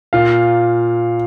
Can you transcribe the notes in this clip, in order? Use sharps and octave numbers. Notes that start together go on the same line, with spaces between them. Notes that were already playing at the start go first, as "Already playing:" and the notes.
A#2 F5